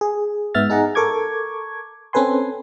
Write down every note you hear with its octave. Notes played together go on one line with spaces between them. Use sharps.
G#4
G#2 B3 E5 F6 A6
D#4 G#4 F#5 A#5
A4 A#4 C#6 D6 G#6
C4 C#4 A4 B4 G#5 C6